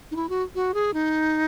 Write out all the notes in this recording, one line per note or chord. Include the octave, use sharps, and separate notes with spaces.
D#4
E4
F#4
F#4
G#4
D#4